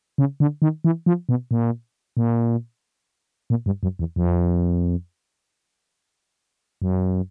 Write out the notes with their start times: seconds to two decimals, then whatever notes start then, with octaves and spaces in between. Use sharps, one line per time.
0.18 C#3
0.40 D3
0.62 D#3
0.84 E3
1.06 F3
1.29 B2
1.51 A#2
2.17 A#2
3.50 A#2
3.66 G2
3.83 F#2
3.99 E2
4.16 F2
6.82 F#2